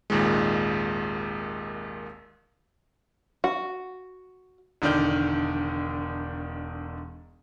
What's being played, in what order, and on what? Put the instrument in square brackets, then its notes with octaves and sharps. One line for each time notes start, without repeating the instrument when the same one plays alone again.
[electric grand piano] G#1 D#2 A#2 D#3 G#3
[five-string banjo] F#4
[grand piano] E1 D3 D#3 D4 F6 G6